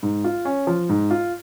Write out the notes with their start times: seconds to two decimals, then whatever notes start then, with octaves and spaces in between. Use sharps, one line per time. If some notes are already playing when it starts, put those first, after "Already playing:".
0.03 G#2
0.24 F4
0.45 C#4
0.67 F3
0.89 G#2
1.11 F4